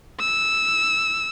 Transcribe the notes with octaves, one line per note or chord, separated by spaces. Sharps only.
E6